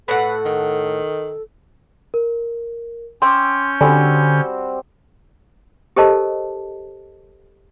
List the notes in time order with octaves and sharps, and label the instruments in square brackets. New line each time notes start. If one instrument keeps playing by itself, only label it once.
[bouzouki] A2 F#5 [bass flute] A4 [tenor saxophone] B4
[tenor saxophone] D#3
[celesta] A#4
[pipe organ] C#4 G6 [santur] G5 E6 [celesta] C6 D6
[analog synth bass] D3 [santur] G3 C4 F#4 [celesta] G#5
[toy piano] G4 A4 A#4 C5 D#5 A5